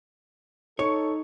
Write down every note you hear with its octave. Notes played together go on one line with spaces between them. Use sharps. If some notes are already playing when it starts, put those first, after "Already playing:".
D#4 A4 C#5 C#6